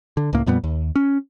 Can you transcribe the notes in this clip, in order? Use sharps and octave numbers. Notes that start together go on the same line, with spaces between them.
D3
C#2 A2 A#3
F2 A#2 G3 B3
D#2
C#4